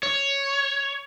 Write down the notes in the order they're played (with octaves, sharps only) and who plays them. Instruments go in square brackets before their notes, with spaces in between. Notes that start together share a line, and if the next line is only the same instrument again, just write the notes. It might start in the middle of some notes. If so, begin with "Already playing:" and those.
[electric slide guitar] C#5